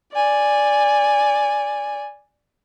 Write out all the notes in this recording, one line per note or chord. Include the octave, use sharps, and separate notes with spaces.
D5 G#5